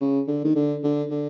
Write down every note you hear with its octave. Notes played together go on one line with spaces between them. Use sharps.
C#3
D3
D#3
D3
D3
D3